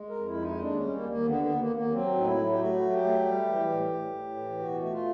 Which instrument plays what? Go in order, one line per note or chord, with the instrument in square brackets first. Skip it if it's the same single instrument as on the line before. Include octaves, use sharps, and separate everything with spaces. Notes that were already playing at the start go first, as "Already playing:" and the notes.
Already playing: [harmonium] G#3
A#4
F2
E4
G#3
D#4
D#2 D4
C#4
G3
A#3
D#2 A#3
D3 B3
B3
D#2
A#3
D#2
A#3
F#3 C4
A2 D#4
E4
F#3
G4
A3 F#4
F#3
G4
A3
G3
E3
A2
A2
A2
E3
B2 F#4
A3 F#4
F4